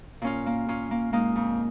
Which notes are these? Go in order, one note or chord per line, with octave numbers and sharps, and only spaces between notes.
A#2 C#4 F4
A#3
A#2 C#4 F4
A#3
G#3 A#3 D#4
F2